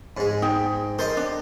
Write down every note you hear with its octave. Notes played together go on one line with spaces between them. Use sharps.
G#2 G#3
D#4 G5
A4 A#4 C5 D#5
D4